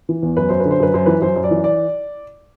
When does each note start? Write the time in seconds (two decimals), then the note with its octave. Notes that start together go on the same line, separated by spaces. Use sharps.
0.09 E3
0.23 E2
0.37 F#2 B4
0.49 F#2 C5
0.60 B4
0.65 D3
0.71 C5
0.80 F#2 B4
0.94 F#2 C5
1.06 E3 B4
1.22 F#2 C5
1.36 F#2
1.44 D5
1.51 E3
1.64 D5